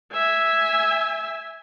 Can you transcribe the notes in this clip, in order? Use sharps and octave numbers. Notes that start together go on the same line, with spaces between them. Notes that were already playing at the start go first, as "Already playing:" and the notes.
E5 G#5